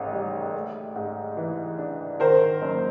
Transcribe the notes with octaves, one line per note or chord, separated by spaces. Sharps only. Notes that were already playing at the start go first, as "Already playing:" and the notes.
Already playing: A1 G#2 D#3
G3
A3
G#2
E3
D4
D#3 A#4 C5
F#1